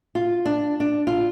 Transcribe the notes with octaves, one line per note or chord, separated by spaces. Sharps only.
F4
D4
D4
F4